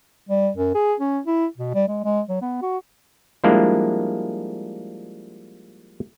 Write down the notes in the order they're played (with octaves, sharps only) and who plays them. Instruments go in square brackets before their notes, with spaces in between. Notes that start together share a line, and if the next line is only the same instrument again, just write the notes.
[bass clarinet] G3
F#2
G#4
C#4
E4
B2
G3
G#3
G#3
F#3
B3
F#4
[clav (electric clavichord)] F3 G3 G#3 A#3 D4 E4